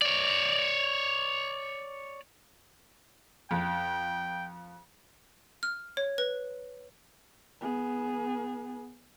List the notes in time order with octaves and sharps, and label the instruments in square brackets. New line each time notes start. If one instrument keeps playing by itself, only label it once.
[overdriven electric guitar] C#5 D5
[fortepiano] F2 [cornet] G5
[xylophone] F6
C#5
B4
[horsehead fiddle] B3 G#4